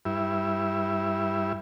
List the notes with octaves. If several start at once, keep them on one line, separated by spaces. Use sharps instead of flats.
G2 E4